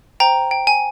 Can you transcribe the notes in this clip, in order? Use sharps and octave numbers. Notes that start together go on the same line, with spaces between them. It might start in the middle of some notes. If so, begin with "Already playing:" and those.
C5 G5 A#5
G5
G#5